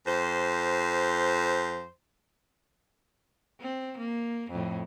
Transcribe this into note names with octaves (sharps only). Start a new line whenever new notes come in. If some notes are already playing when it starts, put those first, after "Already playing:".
F2 C5
C4
A#3
F2 A2